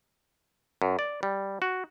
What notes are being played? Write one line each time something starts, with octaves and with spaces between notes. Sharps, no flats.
F#2
D5
G3
F#4